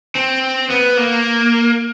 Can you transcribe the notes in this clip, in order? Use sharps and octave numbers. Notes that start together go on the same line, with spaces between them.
C4
B3
A#3